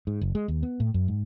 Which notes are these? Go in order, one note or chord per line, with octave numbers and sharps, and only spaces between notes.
G#2
F#1
G#3
D#2
B3
A2
F#2
G#2